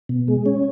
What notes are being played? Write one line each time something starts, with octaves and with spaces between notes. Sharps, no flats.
B2
G#3
C#4